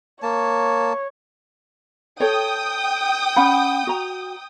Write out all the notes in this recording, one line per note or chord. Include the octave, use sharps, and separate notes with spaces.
A#3 C#5 A5
A4 C#5 G5 D#6
C#4 F#5 B5
F#4 A#5